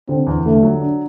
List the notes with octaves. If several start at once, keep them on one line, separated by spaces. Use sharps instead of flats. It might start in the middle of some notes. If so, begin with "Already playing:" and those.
D3 C4
E2
D3 A3
F#3
D4